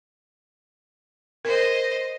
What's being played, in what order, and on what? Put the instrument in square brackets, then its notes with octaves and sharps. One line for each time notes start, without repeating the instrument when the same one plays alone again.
[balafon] A#4 [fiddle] C5 D#5